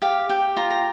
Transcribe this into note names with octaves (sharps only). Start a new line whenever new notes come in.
G4 F5
G4 G5
F4 A#5
A#5